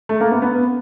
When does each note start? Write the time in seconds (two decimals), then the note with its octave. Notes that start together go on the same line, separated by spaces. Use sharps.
0.09 A3
0.21 A#3
0.31 B3
0.42 B3